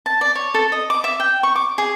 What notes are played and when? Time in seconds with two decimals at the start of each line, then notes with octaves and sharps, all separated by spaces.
0.06 A5
0.21 D5
0.35 C#5
0.54 A4
0.72 D#5
0.90 D6
1.04 E5
1.20 G5
1.43 C#6
1.56 D6
1.78 G#4